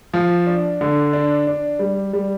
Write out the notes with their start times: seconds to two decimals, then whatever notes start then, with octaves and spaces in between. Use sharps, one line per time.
0.14 F3
0.47 D4
0.81 D3
1.13 D4
1.47 D4
1.79 G3
2.13 G3